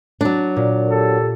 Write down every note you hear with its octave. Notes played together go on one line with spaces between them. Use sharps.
F#3 D4
A#2
G4 A4